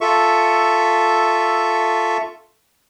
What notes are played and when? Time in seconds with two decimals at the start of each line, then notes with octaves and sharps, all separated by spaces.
0.01 F4 A4 E5 C#6